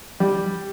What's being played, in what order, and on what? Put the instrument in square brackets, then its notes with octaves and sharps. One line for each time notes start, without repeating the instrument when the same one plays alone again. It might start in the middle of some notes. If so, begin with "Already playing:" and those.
[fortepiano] G3